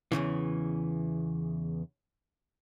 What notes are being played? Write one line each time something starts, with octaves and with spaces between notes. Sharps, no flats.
E2 G2 C#3 E3